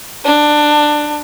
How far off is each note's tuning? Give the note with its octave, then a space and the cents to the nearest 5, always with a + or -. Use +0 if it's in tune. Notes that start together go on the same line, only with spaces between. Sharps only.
D4 +15